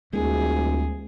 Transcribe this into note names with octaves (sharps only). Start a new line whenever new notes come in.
D#1 D2 G#3 G#4